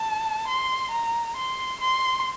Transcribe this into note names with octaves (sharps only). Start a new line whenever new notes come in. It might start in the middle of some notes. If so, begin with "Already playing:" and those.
Already playing: A5
C6
A#5
C6
C6